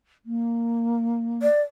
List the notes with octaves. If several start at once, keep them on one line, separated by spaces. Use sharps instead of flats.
A#3
D5